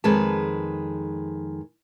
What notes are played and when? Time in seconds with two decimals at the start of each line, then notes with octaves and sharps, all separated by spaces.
0.04 F2 D#3 G#3 G#4 B4 A5